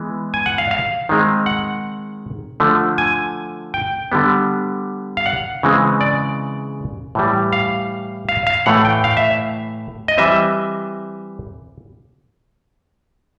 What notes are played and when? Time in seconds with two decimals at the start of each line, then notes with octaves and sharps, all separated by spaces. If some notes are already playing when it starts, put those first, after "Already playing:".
Already playing: E3 G#3 B3
0.34 G#5
0.46 F#5
0.58 F5
0.71 F5
1.09 D#3 G#3 C4
1.46 F#5
2.60 D3 F3 A3
2.98 G#5
3.74 G5
4.12 D3 G3 B3
5.17 F5
5.26 F#5
5.63 C#3 E3 G#3 C4
6.01 D5
7.15 A2 E3 G3
7.53 F5
8.29 F5
8.47 F5
8.66 A2 E3 A3 F#5
8.85 G5
9.04 F5
9.17 E5
10.08 D#5
10.18 E3 G3 C4 E5